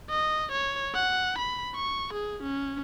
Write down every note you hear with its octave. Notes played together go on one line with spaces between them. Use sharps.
D#5
C#5
F#5
B5
C#6
G#4
C#4